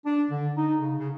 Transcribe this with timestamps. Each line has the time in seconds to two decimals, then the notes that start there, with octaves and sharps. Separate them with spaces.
0.06 D4
0.31 D3
0.57 D#4
0.81 C#3
0.99 C#3